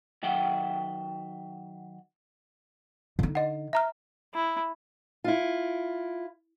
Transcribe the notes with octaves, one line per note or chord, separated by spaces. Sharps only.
D#3 F#3 E5 F#5 G5
D3 D#4
D#5 F#5
E5 A#5 F6
E4
E4 F4